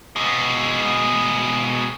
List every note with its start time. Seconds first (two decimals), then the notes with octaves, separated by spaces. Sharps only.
0.16 B2 G#3